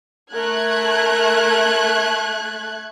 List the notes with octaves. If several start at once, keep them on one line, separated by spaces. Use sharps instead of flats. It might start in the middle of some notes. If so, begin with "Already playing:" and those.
A3 A#4 F#6 G#6